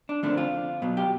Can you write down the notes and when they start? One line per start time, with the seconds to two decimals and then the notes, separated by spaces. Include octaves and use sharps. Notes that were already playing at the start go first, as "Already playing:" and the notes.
0.09 D4
0.23 D3 F3 A3 C4 D4
0.37 F4
0.82 B2 F#3 B3
0.97 G4